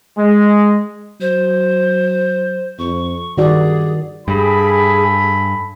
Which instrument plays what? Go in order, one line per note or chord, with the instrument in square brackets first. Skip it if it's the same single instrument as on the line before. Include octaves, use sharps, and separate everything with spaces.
[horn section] G#3
[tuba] F#3 [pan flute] C5
[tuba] F2 [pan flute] C#6
[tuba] G2 [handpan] D#3 F#4 D5 [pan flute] G#4
[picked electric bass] G2 [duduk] G#4 [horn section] A4 G#5 B5